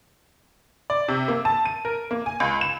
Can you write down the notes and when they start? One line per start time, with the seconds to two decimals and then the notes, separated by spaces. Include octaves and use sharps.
0.90 D5
1.08 C3
1.28 A#3
1.45 A5
1.65 D#7
1.85 A#4
2.11 A#3
2.26 G#5
2.40 C#2
2.61 E7